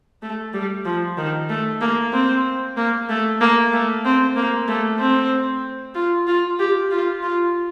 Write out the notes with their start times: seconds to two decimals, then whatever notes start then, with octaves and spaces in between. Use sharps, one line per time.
0.22 A3
0.54 G3
0.85 F3
1.18 D#3
1.50 A3
1.81 A#3
2.13 C4
2.77 A#3
3.09 A3
3.41 A#3
3.73 A3
4.05 C4
4.36 A#3
4.68 A3
4.99 C4
5.95 F4
6.27 F4
6.60 G4
6.91 F4
7.23 F4